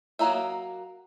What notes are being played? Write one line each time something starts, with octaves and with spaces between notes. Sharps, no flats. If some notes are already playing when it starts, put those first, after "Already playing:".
F#3 A#3 A#4 D#5 E5